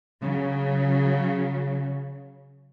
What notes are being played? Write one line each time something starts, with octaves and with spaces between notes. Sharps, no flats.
C#3 F#3